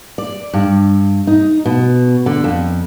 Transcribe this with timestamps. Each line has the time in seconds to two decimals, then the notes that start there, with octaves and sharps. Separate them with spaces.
0.18 D5
0.54 G2
1.27 D#4
1.66 B2
2.26 D3
2.44 F2